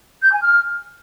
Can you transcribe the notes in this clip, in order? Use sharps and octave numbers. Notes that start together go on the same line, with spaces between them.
G6
G#5
F6